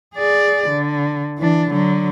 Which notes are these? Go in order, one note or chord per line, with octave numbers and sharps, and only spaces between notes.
G#4 D5
D3
E3 D4
D3 F#3